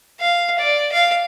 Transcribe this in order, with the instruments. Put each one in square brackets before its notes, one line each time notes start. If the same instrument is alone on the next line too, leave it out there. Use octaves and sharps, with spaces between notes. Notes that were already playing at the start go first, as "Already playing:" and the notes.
[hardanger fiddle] F5
D5
F5